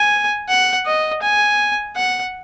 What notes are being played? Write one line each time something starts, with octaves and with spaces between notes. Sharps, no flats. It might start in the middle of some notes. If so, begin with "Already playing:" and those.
Already playing: G#5
F#5
D#5
G#5
F#5